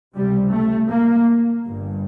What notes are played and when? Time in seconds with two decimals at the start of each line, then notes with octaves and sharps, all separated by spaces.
0.15 C#2 C3 G3
0.52 A3
0.90 A#3
1.65 G1 G2